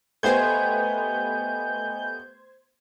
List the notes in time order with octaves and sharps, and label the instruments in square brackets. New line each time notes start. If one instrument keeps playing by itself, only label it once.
[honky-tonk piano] A3 B3 G4 [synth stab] C5 G#6 [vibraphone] D#5 G#5 [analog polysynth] G6